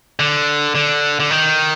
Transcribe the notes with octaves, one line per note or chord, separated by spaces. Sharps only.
D3
D3
D3
D#3